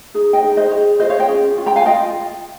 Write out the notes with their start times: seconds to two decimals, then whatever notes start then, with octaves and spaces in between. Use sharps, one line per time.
0.14 D#4 G#4
0.33 D#5 G5
0.43 D#4 G#4
0.57 C5 D#5
0.71 F4 G#4 C#5
1.00 F4 G#4 C5 D#5
1.10 C#5 F5
1.19 D#5 G5
1.28 C#4 F4 G#4
1.57 C#4 F4
1.66 G5 A#5
1.76 F5 G#5
1.85 F4 D#5 G5